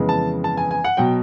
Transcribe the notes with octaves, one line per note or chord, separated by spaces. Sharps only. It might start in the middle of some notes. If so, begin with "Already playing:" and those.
Already playing: F2 C#3 E3 G#3 B3
A5
A5
G#5
G#5
F#5
B2 F#3 G5